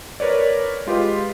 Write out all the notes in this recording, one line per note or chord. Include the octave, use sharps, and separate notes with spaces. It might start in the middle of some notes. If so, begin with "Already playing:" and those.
A#4 B4 C#5 D5
G#3 F4 G4 B4 D#5